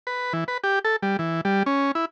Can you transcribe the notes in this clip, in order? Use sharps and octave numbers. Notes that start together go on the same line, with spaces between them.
B4
E3
B4
G4
A4
G3
E3
G3
C#4
E4